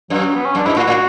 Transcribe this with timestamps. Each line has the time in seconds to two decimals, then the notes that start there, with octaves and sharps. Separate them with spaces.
0.10 F#2 F#3
0.34 B3
0.45 C#4
0.55 F#2 D4
0.66 G2 E4
0.76 A2 F#4
0.87 A2